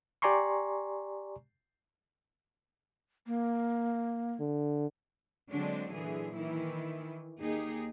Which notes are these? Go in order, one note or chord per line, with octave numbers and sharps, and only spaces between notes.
G4 D5 G#5 A#5 C6 C#6
A#3
D3
D3 F#3 G#3 C4 D4
A#2 D3 E3 F#3 G#4
D#3 E3 E4
D#2 D#4 G4 G#4